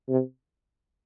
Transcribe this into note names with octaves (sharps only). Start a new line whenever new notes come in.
C3